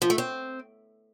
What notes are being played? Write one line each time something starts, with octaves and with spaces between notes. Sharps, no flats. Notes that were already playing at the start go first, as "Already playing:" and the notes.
F3
A3
C4